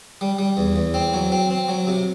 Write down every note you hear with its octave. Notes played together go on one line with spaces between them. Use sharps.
G3
G3
E2
E2
C4
F#3
C4
C4
F#3
C3